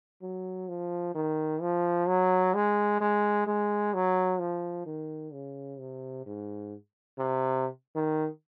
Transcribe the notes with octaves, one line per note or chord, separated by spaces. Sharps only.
F#3
F3
D#3
F3
F#3
G#3
G#3
G#3
F#3
F3
D#3
C#3
C3
G#2
C3
D#3